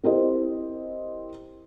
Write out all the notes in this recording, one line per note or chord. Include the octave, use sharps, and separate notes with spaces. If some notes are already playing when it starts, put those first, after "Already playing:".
C4 E4 G4 A#4 C5 D#5